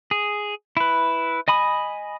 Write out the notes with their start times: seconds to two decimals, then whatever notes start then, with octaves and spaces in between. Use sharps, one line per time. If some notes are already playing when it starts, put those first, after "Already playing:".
0.11 G#4
0.77 E4 B4
1.48 D#5 G#5 B5 D#6